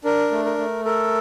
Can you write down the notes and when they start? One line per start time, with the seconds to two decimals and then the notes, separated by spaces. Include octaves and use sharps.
0.05 D4 A#4
0.31 A3
0.45 A#4
0.58 A3
0.85 A4 A#4